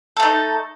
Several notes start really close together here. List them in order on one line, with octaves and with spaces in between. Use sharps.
A4 A3 D#4